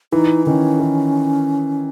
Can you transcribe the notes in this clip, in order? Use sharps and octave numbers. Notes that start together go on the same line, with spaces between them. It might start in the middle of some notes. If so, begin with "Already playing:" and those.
E3 D#4
D#3 C#4
E3